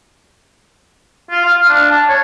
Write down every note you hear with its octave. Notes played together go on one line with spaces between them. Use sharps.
F4
F5
D4
A5
C#5